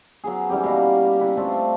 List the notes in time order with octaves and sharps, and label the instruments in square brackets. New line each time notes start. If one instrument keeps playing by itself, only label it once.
[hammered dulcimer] F#3 B3 G#4
E3 G3 C#4 G4
B2 A#3 G4 A#4
E4 B4 F#5
A3 C4 D4 F4